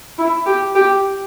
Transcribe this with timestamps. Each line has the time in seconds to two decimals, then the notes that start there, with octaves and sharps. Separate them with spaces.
0.18 E4
0.46 G4
0.75 G4